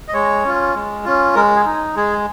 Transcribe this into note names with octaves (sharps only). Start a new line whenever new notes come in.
D#5
G#3 C#5
C#4 F4
G#3
C#4 F4
G#3 A#4
G#4
D#4
G#3 G#4